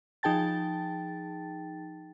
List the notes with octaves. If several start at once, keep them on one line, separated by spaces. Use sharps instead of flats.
F3 D#4 G#4 G5 A5 A6